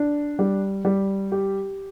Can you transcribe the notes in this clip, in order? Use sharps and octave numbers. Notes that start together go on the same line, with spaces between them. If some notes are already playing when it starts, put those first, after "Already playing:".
Already playing: D4
G3
G3
G4